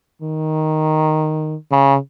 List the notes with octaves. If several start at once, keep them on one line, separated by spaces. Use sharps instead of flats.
D#3
C#3